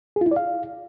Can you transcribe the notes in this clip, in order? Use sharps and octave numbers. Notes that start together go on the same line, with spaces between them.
G#4
F4
E4
D5
F5